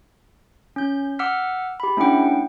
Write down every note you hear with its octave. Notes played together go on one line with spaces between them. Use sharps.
C#4 G6
F#5 D6 E6 F6 B6
G4 B5
A3 C#4 D4 E4 F#5 G5